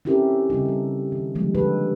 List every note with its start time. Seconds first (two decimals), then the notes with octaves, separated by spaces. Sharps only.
0.05 C4 C#4 E4 G4 A4 A#4
0.50 C#3 G3 C4 D#4
0.65 G3 A4
1.12 D#3
1.35 D3 D#3 F3 G3 G#3 A#3
1.55 D3 D#4 G4 A4 B4